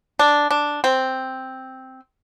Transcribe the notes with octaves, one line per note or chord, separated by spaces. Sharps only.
D4
D4
C4